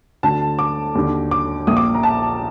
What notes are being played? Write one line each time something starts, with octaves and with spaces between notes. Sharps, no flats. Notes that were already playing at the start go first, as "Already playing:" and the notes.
D2 D3 A5
D6
D#2 D3
D6
A#1 A#2 D#6
D6
A#5
A5